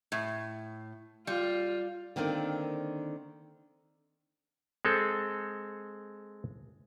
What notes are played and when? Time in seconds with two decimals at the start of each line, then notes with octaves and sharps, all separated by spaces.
0.12 A2
1.27 G3 F4
2.16 D3 D#3 A#3 C4 D4
4.85 G#3 C4 A4